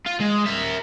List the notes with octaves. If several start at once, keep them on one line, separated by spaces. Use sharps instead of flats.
F4
G#3
A#4 E5